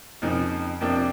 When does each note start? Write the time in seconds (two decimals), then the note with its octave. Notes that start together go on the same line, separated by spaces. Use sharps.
0.22 F2 C#3 F3 A#3 D#4
0.80 F2 C3 F3 A#3 D4